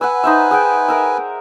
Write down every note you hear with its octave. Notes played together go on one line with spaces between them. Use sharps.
B4 F#5 G#5 E6
D#4 C5 E5
G#4 F#5 G5
A#4 E5